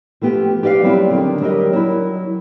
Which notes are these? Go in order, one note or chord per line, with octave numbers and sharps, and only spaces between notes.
F3 A3 B3 G4
G4 B4 D5 E5 F5
F#3 G3 B3 C4 E4 G4
D3 D#3
F#3 G3 G4 A#4 D#5
F#3 E4